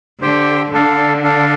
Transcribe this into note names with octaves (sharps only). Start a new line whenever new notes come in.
D3 G4 C5 G5
D3 D4 A4 D5 F5
D4 A4 D5 F5